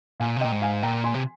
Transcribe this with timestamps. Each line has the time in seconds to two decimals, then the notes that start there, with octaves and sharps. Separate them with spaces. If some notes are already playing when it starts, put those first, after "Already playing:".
0.20 A#2 F5 G#5
0.36 C3
0.41 A#2 D#5 G5
0.52 G#2
0.62 F5 G#5
0.83 A#2 G5 A#5
1.04 G#5 C6
1.14 C3